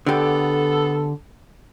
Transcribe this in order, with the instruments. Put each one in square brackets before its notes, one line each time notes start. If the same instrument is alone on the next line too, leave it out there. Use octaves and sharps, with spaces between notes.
[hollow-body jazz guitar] D3 G4 [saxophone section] B3 A4